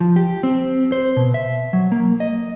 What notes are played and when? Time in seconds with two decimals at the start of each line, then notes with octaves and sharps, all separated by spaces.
0.01 F3
0.16 G4
0.43 C4
0.92 C5
1.17 B2
1.34 E5
1.73 F#3
1.92 A#3
2.20 D#5